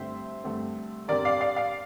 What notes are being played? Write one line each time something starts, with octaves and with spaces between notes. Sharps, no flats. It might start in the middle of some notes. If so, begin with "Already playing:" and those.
Already playing: G2 D3 A3 C4 C5 E5
G2 D3 A3 C4
G2 D3 G3 C4 A#4 D5
D5 F5
D5 F5
D5 F5